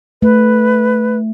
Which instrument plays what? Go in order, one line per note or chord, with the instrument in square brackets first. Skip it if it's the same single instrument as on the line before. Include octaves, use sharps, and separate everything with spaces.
[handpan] A3 [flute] B4